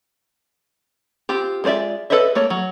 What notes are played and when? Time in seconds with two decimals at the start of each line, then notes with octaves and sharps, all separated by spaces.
1.29 C4 F4 G4
1.64 G#3 F4 C5 D5 E5
2.10 A4 B4 C#5 D#5 E5
2.35 A3 A#3 C#5
2.50 F#3